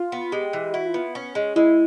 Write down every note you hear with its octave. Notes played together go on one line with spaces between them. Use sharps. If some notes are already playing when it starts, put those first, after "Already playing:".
Already playing: F4
B3
G#3 G4
E3
E4 F#4
F4
B3
C#4
G#3
G#3 E4